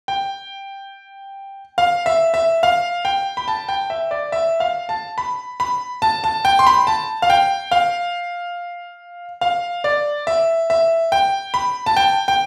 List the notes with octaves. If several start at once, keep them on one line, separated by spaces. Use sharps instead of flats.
G5
F5
E5
E5
F5
G5
B5
A5
G5
E5
D5
E5
F5
A5
B5
B5
A5
A5
G5
C6
B5
A5
F5
G5
F5
F5
D5
E5
E5
G5
B5
A5
G5
G5